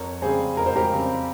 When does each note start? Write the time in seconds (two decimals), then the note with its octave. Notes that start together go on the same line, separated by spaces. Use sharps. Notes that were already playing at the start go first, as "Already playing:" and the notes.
Already playing: F2 A#4 C#5
0.22 C#3 G3 C4 G#4 C5
0.57 F2 A#4
0.66 C5
0.76 G4 A#4
0.92 C#3 G3 C4